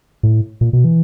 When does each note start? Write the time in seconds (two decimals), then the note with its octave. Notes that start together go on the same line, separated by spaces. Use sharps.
0.23 A2
0.61 A#2
0.73 B2
0.84 E3